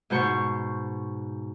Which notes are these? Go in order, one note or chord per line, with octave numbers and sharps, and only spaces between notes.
G#2 B2 C5 C#6